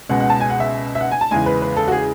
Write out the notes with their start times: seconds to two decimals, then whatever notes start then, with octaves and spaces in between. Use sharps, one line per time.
0.09 C#2 B2 G#3 F#5
0.20 F#5
0.30 A5
0.40 G#5
0.50 F#5
0.60 E5
0.95 E5
1.01 F#5
1.11 G#5
1.21 A5
1.31 E2 C#3 G#3 G#5
1.46 B4
1.62 B4
1.77 A4
1.87 F#4
1.92 G#4